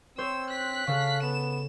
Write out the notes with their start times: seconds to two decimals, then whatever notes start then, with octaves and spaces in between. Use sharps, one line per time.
0.18 C4 C5 C#5 E6
0.50 F#6 B6
0.87 C#3 A4 F5
1.22 B3 E7